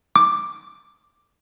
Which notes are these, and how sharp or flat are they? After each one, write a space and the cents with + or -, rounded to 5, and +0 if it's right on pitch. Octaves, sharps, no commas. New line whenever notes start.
D6 +5